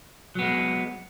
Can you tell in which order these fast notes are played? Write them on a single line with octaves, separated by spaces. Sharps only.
F#3 B3 G#3